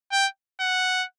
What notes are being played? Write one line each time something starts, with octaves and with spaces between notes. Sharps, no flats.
G5
F#5